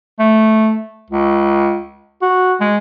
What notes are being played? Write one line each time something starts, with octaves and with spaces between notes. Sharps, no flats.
A3
C#2
F#4
G#3